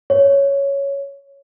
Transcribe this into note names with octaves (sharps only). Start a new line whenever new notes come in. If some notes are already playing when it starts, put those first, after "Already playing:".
C#5